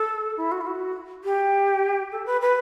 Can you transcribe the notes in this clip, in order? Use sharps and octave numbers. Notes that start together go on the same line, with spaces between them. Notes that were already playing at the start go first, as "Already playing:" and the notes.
Already playing: A4
E4
F#4
E4
F#4
G4
A4
B4
B4